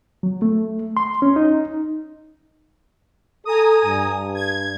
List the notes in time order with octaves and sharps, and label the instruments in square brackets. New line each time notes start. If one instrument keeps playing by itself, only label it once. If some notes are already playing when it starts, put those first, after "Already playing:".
[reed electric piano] F#3
A3
C6
C#4
D#4
[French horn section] A4 [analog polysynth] G#5 A#5 D#6
[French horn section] G2
[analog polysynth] G#6